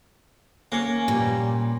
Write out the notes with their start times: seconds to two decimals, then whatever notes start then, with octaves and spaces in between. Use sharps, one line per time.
0.72 A#3 C#4 C#5
1.08 A#2 G3